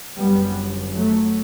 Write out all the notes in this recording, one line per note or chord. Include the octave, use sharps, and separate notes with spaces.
G1 F#2 G3 B3
F#3 A3